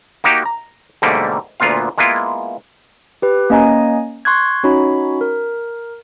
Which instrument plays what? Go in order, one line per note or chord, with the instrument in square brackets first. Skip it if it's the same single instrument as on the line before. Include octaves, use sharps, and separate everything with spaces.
[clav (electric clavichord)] A#3 D#4 F#4 G4
A#5
G#2 B2 D3 G3 A3 A#3
D2 A#2 B3 F4 F5
G#3 A#3 B3 E4 F4
[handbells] G4 B4
A#3 C#4 D#5 G#5 A#5
C6 C#6 F#6 G#6
C#4 D#4 F#4 C#5 A#5 B5
A#4